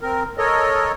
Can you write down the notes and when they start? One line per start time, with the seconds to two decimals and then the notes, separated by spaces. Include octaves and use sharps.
0.01 C4 A#4
0.38 A4 A#4 C#5 D#5